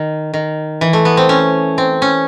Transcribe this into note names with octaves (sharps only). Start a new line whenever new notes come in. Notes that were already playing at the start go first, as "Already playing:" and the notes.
Already playing: D#3
D#3
E3
A3
B3
C4
C#4
C4
C#4